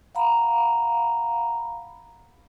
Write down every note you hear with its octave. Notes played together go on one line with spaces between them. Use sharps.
F5 F#5 A#5 B5